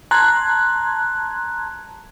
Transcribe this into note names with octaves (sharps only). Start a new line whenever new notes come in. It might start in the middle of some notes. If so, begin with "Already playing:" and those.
A5 A#5 C6 F#6 G#6